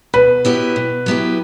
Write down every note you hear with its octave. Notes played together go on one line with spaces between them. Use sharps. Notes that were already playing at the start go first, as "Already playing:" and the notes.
B2 B4
F#3 B3 E4 G4
B2
F#3 B3 E4 G4